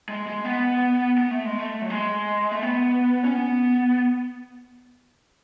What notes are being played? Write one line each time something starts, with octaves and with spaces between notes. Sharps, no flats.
G#3
G#3
B3
B3
A3
G#3
A3
F#3
G#3
A3
B3
C#4
B3